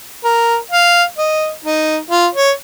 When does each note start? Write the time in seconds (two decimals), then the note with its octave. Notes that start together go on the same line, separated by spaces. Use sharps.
0.24 A#4
0.71 F5
1.18 D#5
1.65 D#4
2.11 F4
2.35 C#5